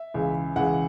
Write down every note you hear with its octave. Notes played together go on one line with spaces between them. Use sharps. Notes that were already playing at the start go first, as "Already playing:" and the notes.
Already playing: E5
C#2 C#3 E3
C#2 C#3 E3 F#5